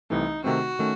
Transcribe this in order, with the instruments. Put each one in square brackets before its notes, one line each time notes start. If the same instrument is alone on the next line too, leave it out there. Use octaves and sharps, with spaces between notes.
[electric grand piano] C2 C3 E3 A3 [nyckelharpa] D#4
[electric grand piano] C3 D#3 A3 C4 [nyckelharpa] F#4
[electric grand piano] D#3 A3 C#4